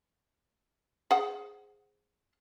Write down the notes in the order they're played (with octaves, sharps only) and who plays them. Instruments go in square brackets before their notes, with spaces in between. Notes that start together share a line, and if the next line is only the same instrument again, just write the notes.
[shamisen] G#4 C5 F#5